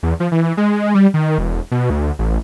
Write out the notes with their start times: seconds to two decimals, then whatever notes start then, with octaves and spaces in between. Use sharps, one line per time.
0.03 E2
0.20 F3
0.32 E3
0.57 G#3
0.95 G3
1.14 D#3
1.38 E1
1.71 B2
1.90 D2
2.19 A1